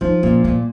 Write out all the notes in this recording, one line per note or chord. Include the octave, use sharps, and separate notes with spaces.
F3 D#4
A#2 C#4
A#2 A#3